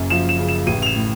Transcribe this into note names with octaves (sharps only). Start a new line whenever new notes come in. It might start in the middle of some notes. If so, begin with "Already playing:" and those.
Already playing: F#1 F#2
F3 E7
E7
C#3
E7
A1 D#7
F7
E7
A2